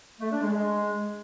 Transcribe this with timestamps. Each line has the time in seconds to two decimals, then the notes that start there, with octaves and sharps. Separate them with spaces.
0.20 A3
0.31 D4
0.41 G#3
0.51 G#3